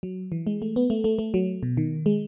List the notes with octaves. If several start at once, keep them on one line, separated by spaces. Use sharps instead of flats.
F#3
E3
G#3
A3
B3
A3
A3
A3
F#3
B2
D#3
G#3